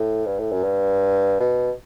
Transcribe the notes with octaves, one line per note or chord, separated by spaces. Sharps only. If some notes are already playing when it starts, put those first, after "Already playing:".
Already playing: A2
G2
A2
F#2
G2
B2